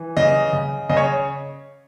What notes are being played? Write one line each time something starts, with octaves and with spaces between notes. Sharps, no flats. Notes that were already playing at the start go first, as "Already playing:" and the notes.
Already playing: E3
C#3 D#5
C#3
C#3 D#5
C#5